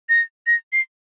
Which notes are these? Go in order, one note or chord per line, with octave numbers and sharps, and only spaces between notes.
A#6
A#6
C7